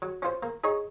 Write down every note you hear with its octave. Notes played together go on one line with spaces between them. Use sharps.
F#3
C#4 F4 C5
A#3
D#4 G#4 C#5